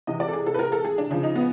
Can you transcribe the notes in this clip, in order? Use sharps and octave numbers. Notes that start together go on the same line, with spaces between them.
C3 E3 D#5
D5
A4
G#4
A4
B4
A#4
A4
G#4
D4
C#3 F3 D4
D#4
B3